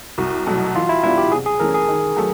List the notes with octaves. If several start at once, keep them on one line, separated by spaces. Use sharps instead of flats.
C2 F#4
B2 F#3 A3
E3 F4
E4
G3 B3 D4 E4 F4
G4
C3 G#4
G#4
E3 A3 C#4 A#4
G#4
D#3
F#3 A3